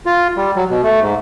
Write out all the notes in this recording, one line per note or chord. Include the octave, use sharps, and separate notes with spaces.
F4
G3
F#3
B2
A3
G#2